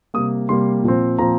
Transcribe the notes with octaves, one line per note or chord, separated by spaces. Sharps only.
C3 G3 A#3 D#6
C3 G3 A#3 C6
A#2 F3 C4
A#2 F3 C4 A#5